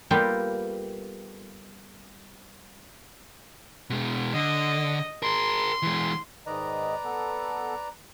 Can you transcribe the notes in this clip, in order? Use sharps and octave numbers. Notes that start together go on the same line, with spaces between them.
G3 A#3 B3 F4 G4 A4
B2 G#3
D3 D#5
G#4 A#4 C6
E3 G#3
G#2 D#3 B4 D5 D#5 A#5
B3 A4